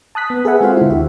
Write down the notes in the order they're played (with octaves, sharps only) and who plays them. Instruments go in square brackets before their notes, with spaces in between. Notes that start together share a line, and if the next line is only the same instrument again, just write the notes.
[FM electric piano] A5 D#6 F#6 B6
B3
G#4 A4 B4 E5 F#5 G#5
G#3 C4 F4 F#4 C5 F5
D3 E4
D#2 F#4 G4 E5